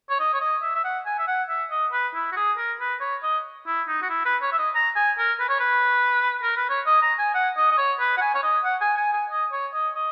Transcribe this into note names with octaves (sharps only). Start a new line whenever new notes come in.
C#5
D#5
C#5
D#5
E5
E5
F#5
G#5
E5
F#5
E5
D#5
B4
E4
F#4
G#4
A#4
B4
C#5
D#5
E4
D#4
F#4
E4
B4
C#5
E5
D#5
A#5
G#5
A#4
B4
C#5
B4
A#4
B4
C#5
D#5
A#5
G#5
F#5
D#5
D#5
C#5
B4
F#5
G#5
C#5
D#5
F#5
G#5
G#5
G#5
D#5
C#5
D#5
D#5